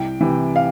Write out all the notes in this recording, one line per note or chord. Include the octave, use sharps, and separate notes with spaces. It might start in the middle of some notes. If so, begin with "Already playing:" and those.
Already playing: C2 G5
C3 E3
F5